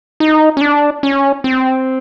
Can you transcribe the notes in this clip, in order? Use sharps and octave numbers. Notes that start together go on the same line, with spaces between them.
D#4
C#4
D4
C#4
C4